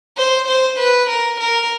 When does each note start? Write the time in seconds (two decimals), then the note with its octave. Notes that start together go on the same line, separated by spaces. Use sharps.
0.17 C5
0.48 C5
0.79 B4
1.09 A#4
1.40 A#4